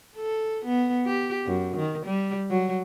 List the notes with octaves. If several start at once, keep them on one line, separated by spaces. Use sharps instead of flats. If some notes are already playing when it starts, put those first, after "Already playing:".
A4
B3
G4
F#2
D#3
G3
F#3